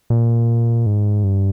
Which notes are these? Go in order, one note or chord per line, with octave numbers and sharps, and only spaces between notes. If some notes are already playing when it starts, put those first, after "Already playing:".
A#2
G#2
G2